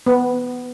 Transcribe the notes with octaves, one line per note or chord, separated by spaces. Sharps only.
B3